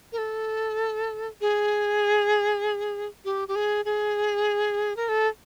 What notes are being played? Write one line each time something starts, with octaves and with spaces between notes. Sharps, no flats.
A#4
A4
G#4
G4
G4
G#4
G#4
A#4
A4